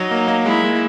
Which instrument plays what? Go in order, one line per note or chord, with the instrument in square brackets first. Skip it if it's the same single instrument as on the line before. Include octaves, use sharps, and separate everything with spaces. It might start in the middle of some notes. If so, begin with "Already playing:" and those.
Already playing: [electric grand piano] F#3 [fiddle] D#4
[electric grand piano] A#3
A#3
[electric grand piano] G#3 [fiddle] E4
[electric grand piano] G#3